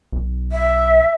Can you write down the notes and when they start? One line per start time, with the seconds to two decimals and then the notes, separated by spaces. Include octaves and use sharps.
0.12 B1
0.52 E5